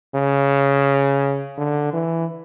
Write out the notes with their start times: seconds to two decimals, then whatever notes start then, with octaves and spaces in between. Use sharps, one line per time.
0.15 C#3
1.57 D3
1.93 E3